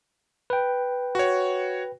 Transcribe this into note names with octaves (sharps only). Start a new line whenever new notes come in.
B4 G5
F#4 C#5